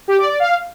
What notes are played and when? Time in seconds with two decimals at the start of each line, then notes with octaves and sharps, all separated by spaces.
0.08 G4
0.18 D5
0.29 D5
0.40 F5